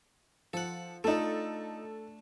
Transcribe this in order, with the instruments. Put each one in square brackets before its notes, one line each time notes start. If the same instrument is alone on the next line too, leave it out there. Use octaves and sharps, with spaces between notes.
[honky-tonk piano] F3 [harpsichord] A4 F#5
[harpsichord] A3 D4 [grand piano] D#4 F4 [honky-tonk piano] A4